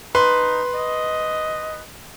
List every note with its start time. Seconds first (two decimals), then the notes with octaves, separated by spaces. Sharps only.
0.15 D#4 B4 C6
0.75 D#5